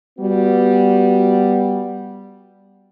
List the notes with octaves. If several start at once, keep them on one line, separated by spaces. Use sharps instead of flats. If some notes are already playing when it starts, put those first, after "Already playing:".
G3 B3 F#4